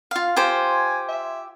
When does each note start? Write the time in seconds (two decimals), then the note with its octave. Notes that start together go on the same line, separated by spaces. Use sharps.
0.11 F4 F5
0.36 F4 G4 C5 G#5
1.09 E5